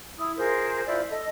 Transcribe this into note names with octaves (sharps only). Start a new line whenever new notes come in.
E4 D#6
F4 G#4 A#4 C5
E4 F4 C5 D5
A4 D#5